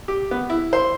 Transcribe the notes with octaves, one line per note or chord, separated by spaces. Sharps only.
G4
B3
E4
C5